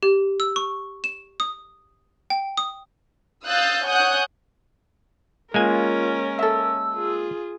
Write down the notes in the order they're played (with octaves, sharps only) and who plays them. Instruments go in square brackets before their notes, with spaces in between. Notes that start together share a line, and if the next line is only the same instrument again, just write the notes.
[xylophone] G4
E6
C#6
E7
D#6
G5
D#6
[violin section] F5 D#6 E6 F#6 G6 A6
C#5 F#5 G#5 D#6 F#6 G6
[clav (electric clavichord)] G#3 A#3 G#5 [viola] C#4 A#4 [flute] F4
[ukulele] A4 E5 [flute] E6
[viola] F4 G#4